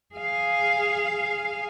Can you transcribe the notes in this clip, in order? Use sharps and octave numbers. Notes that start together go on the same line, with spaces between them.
G#4 F5